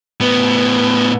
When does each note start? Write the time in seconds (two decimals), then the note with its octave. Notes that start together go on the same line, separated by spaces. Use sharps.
0.20 A2 B3